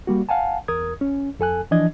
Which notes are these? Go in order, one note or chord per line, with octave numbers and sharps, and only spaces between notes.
G3 A#3 F#4
F5 F#5 G#5 A5
E2 A#4 D#6 G#6
C#4
F2 A4 G#5 F#6
E3 F3 D4 D#5 G#6